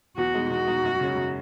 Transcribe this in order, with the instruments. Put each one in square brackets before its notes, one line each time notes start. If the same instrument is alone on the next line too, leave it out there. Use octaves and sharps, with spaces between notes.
[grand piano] E2 [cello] F#4
[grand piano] B2 G#3 D#4
[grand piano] E2 [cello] F#4
[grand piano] B2 G#3 D#4
F#2
C#3 G#3 C#4
F#2